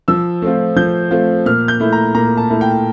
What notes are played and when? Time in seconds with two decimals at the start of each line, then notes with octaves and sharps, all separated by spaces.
0.08 F3 E6
0.42 A3 C4 F4
0.76 F3 G6
1.11 A3 C4 F4
1.46 A#2 F6
1.68 G6
1.80 A3 E4
1.93 A#5
2.14 A#2 A#5
2.37 A5
2.50 A3 E4
2.61 G5